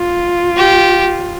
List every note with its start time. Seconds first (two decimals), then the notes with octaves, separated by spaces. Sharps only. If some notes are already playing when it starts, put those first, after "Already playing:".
Already playing: F4
0.57 G4